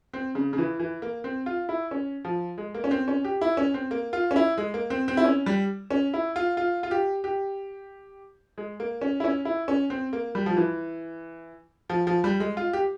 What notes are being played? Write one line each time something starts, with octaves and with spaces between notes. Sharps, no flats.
C4
C#3
C#3
E3
E3
A#3
C4
F4
E4
C#4
F3
G#3
A#3
C#4
C4
C#4
G4
E4
C#4
C4
A#3
F4
C#4
E4
G#3
A#3
C4
C4
E4
C#4
G3
C#4
E4
F4
F4
F4
G4
G4
G#3
A#3
C#4
E4
C#4
E4
C#4
C4
A#3
G3
F3
E3
F3
F3
G3
G#3
F4
G4